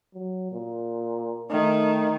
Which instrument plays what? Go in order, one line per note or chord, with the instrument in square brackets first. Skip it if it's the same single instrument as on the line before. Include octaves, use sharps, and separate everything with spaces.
[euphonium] F#3
A#2
[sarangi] D#3 [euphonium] A3